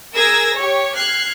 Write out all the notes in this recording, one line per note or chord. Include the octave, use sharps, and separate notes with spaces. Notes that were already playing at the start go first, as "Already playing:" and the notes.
G#4 A#4 E6 G#6 A#6
G4 C#5
F6 F#6 G#6 C7